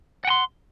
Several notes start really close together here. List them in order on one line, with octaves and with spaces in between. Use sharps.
F#5 G5 C6